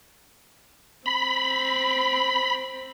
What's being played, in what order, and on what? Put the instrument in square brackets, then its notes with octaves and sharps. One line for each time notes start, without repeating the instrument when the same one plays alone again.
[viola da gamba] C4 [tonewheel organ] B5